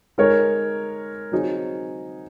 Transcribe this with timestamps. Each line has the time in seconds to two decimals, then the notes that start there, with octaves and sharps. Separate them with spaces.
0.18 G#3 D#4 A#4 C#5
1.32 F#3 C4 D#4 G#4 C#5